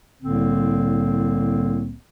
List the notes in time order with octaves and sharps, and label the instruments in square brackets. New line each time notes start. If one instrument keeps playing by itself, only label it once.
[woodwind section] C2 A2 D3 A#3 C4